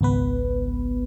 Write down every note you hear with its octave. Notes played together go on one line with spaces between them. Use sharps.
G#1 C#2 B3 B4